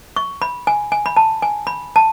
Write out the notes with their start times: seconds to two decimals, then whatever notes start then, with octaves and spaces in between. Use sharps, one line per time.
0.16 C#6
0.42 B5
0.67 G#5
0.92 G#5
1.06 B5
1.17 A5
1.42 G#5
1.67 B5
1.96 A5